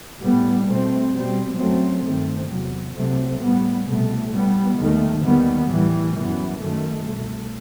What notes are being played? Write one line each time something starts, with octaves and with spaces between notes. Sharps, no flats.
A2 G3 B3
B2 A3 C4
B2 G3 C4
F#2 F#3 A3 C4
G2 D#3 A3 C4
E2 C3 F#3
C2 C3 F#3 A3 C4
A2 G3 B3
C2 B2 A3
A2 G3 B3
D#2 D#3 A3
D#2 D#3 G3 B3
A2 E3 G3
F#2 E3 B3
F#2 D#3 A3
C2 B2 A3